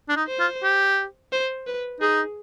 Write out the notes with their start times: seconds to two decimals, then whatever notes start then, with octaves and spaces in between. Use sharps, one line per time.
0.09 D4
0.16 D#4
0.28 C5
0.40 F4
0.63 G4
1.32 C5
1.67 B4
2.00 D#4 G#4